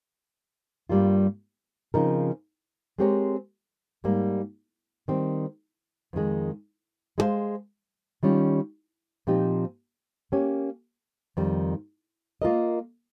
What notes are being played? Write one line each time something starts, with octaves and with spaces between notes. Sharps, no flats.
G2 G3 A#3 F4
C#3 F3 C4 D#4 A#4
G#3 C4 G4 A#4 C#5
G#2 G3 A#3
D#3 G3 C4
F2 D#3 G#3
G#3 D#4 G#4 C5 F5
D#3 G3 C#4 F4
A#2 F3 C4 D#4 G4
A#3 C#4 G4 C#5
F2 D#3 G3
A#3 F4 A#4 D#5